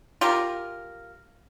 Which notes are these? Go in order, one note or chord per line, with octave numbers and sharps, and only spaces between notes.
F4 G4 A#4